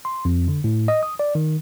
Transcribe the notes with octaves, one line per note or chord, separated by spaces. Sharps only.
C6
F2
D3
A2
D#5
D#6
D5
D#3